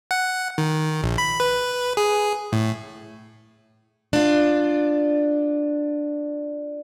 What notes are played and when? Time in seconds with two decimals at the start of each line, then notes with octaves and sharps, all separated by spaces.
0.11 F#5
0.58 D#3
1.03 A#1
1.18 B5
1.40 B4
1.97 G#4
2.52 A2
4.13 D4 F4